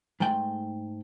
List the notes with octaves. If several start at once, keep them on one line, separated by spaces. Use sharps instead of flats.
G#2 G#3 A3 G5